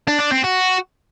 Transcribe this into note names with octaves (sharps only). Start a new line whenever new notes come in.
D4
D4
C4
F#4